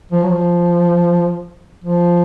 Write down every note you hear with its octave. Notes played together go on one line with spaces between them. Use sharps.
F3
F#3
F3
F3